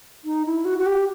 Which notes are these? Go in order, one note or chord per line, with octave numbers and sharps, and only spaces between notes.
D#4
E4
F#4
F#4
G4